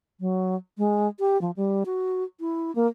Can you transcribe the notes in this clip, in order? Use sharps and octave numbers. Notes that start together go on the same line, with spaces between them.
F#3
G#3
G4
F3
G3
F#4
E4
A#3